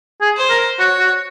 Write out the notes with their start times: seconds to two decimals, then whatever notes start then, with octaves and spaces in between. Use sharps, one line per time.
0.21 G#4
0.36 C5
0.50 A#4
0.79 F#4 C#5
0.99 F#4